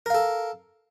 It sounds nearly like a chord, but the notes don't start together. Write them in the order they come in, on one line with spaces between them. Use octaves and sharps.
A#4 F5 A4